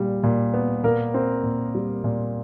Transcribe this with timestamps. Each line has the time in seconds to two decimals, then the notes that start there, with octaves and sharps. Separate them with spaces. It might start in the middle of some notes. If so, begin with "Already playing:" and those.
Already playing: A#2 G3
0.23 A#2
0.54 B3
0.84 A#2 A#3 A#4
1.14 C4
1.43 A#2
1.75 G3
2.04 A#2